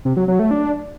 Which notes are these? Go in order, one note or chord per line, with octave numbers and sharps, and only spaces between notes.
C3
F#3
F#3
A3
D4